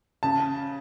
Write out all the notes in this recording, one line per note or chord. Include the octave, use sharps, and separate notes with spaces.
C#3 A5